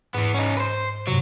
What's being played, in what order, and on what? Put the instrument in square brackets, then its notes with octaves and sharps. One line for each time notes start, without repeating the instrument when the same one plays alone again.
[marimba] G#2 [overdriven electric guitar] E3 B3
[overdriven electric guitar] C#4 D#4
B4 C5
[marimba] G2 C3 [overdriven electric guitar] F#3